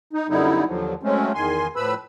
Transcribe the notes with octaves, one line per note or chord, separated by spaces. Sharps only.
D#4
F#2 D3 G3 B3 D#4 E4
D#2 D3 F3 F#3
F#3 G#3 A3 C4 C#4
E2 D#3 G#5 C6
A2 F3 B4 B5 E6